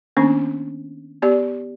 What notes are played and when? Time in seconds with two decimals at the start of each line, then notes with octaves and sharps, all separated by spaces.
0.17 D#3 A#3 B3 C#4 D4
1.22 B3 G4 D5